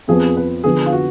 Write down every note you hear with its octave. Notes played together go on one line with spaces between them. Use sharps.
F2 F3 B3 G#4
B4
D3 F3 B3 G#4
F4
F#4